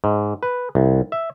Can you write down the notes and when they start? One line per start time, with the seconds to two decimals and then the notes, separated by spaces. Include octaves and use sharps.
0.04 G#2
0.43 B4
0.75 C2
1.12 E5